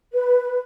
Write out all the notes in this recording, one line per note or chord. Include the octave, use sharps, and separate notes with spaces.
B4